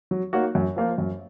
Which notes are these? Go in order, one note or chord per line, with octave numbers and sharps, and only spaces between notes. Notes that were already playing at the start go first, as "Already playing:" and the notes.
F#3
A#3 D#4 F#4 C#5
F#2
F3 A#3 F4 C5
F#2